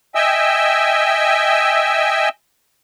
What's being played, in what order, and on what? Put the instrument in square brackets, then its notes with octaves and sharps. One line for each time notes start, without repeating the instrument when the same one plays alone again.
[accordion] D#5 E5 G5 G#5 E6